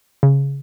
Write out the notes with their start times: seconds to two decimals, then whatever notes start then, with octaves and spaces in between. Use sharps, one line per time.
0.23 C#3